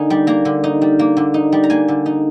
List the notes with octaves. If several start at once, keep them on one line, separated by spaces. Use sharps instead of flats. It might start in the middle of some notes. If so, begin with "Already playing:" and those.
Already playing: D3 A#3 D#4 G#5
G3
A#3 A#5
D3
D#4
G3
A#3
D3
D#4
G3
A#5
A#3 G#5
D3
D#4